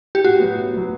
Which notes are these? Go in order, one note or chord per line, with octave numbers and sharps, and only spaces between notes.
G4
A2 F#4
F#3 B3
A2
F#3 B3